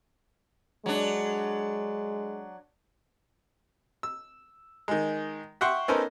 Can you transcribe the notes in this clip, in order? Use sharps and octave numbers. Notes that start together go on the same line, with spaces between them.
F#3 G#3 D4
E6
D#3 G#3
E5 F#5 G5 C6 C#6
B3 C#4 D#4 A4 A#4 C5